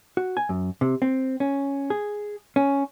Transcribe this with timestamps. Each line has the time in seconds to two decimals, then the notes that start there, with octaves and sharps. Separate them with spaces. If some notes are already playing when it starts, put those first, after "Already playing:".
0.17 F#4
0.37 G#5
0.49 F#2
0.81 C3
1.02 C4
1.40 C#4
1.90 G#4
2.56 C#4